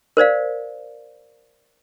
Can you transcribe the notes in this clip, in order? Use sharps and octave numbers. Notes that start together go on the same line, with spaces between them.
A#4 C5 D5 F5